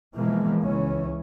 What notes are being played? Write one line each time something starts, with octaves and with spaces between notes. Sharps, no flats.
B2 E3 F3 G#3 A#3
C#2 E3 C#4